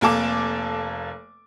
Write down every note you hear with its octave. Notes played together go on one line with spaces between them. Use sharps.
F1 A#3 A4 A5 D6